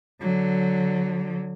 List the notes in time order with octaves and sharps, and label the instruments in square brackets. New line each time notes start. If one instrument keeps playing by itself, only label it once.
[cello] D3 F#3